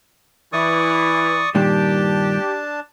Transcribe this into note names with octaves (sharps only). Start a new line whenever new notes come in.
E3 D5 C#6 D#6
G2 A#2 D#3 D4 G4 A5